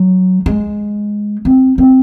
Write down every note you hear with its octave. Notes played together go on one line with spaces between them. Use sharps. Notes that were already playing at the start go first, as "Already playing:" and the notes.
Already playing: F#3
G#3
C4
C4